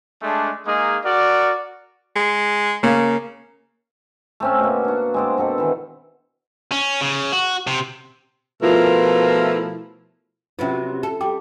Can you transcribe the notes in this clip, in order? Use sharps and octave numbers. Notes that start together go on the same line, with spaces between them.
G#3 A3 D4
G#3 A#3 D#4 G#4
F#4 A#4 D5
G#3
C#3 A#3
A3 C4 C#4
B2 A#3
D4 F#4
G#3 C4 D5
B2 C4 A4
D#3 E3
C#4
C#3
F#4
C3
B2 F3 A3 E4 F4 A#4
C3 F#3 B3 C#4 F4
A4
G3 G5 D6